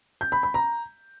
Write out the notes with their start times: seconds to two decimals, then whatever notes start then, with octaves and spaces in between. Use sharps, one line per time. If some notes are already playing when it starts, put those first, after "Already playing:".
0.21 G6
0.32 B5
0.43 B5
0.54 A#5